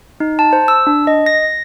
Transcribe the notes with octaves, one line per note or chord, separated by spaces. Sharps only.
D#4
A5
C5
E6
D4
D#5
A#6